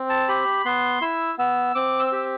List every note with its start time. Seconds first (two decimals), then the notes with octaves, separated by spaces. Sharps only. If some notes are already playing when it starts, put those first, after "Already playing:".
Already playing: C4
0.10 A5
0.28 G4 B5
0.65 B3 C6
1.01 E4 E6
1.39 B3 E6
1.75 C4 D6
1.99 E6
2.12 G4